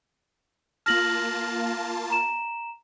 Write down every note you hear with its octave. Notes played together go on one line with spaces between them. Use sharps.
A#3 F4 A5 F6 A#6 F#7
A#5 E7